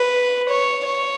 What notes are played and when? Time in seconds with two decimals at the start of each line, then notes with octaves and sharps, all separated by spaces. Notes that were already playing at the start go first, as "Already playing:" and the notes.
Already playing: B4
0.49 C#5
0.86 C#5